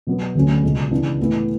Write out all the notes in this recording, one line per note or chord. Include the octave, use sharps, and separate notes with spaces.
B2 F#3 B3
D2 D3 F#3 C#4
C#2 B2 G#3
C#3 E3 B3 D4
A2 E3 B3 E4